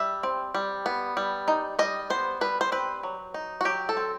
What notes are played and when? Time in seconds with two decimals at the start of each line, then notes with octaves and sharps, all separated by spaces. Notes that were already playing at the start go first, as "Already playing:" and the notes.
Already playing: G3 E5
0.23 C4
0.55 G3
0.86 B3
1.17 G3
1.48 D#4
1.79 G3 D#5
2.10 B3 C5
2.41 G3 B4
2.61 C5
2.72 C4 B4
3.03 F#3
3.34 D#4
3.61 F#4
3.65 F#3 G4
3.89 A4
3.97 C4